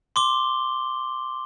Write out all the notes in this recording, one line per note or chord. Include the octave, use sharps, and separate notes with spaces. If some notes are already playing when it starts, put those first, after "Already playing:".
C6 D6 G7